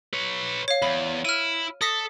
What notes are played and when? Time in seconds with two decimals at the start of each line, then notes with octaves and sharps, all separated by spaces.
0.13 B4 C#5
0.68 C#5 F5
0.82 E2 B5
1.25 E4 F6 D#7
1.81 A4 D#6 A#6 B6